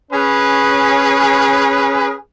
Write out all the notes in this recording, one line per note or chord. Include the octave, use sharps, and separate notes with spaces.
C#4 G#4 B4